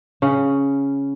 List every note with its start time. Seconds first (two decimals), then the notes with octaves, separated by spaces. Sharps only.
0.22 C#3 C#4